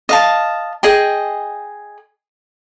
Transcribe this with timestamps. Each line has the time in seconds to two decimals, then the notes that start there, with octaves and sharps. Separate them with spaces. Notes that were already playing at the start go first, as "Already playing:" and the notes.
0.09 D#5 F5 A5
0.83 G#4 D#5 G5